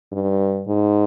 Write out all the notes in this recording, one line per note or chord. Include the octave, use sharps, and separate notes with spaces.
G2
G#2